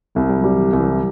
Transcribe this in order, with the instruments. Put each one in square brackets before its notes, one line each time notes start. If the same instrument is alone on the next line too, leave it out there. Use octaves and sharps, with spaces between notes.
[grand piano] C2 [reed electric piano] G3
[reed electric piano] G3
F#3
[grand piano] G3
[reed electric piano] E3
[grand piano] C2
[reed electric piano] E3